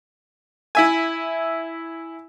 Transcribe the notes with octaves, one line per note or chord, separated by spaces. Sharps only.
E4 E5 G#5